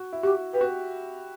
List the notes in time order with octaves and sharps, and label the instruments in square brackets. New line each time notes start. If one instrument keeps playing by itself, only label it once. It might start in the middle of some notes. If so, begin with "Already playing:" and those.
Already playing: [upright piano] F#4
E4
[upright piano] F#4 [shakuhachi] G4
[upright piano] G4 [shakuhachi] B4
[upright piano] F#4